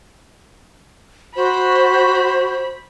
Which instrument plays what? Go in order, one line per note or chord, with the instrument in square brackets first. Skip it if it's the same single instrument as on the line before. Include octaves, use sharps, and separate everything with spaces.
[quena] F#4 [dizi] C5 [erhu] B5